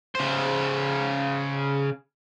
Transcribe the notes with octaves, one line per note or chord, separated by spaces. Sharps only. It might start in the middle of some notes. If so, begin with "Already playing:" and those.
C#3 C5